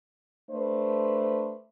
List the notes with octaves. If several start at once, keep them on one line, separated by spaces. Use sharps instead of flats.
A3 D4 B4 C5